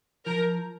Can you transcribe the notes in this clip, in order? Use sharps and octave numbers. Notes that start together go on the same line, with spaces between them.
F3 A#4